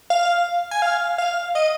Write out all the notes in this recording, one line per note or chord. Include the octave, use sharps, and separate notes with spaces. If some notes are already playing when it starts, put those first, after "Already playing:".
F5
G#5
F5
F5
D#5